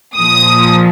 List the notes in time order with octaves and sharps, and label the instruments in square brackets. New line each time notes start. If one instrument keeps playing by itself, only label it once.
[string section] A#2 F3 D#6